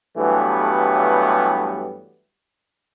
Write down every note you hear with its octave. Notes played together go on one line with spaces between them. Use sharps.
G2 E3 F#3 G3 A3 B3